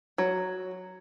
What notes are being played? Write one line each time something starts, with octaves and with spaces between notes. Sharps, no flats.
F#3